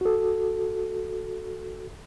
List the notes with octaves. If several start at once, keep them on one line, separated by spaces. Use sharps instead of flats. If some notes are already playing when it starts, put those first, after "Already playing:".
F#4 A4